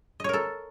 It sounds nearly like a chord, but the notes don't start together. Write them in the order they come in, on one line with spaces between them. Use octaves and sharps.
D#5 C#5 A#4 A4